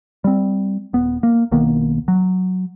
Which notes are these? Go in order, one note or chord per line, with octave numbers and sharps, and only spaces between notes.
G3 C4
D#1 B3
A#3
B1 D#3 A#3 B3
F#3